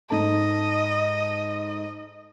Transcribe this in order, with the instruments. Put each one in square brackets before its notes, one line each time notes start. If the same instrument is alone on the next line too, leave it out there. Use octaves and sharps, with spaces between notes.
[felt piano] G#2 A4 A5 [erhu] D#5